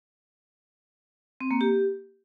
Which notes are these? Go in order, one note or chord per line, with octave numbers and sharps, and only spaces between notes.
C4
A#3
G4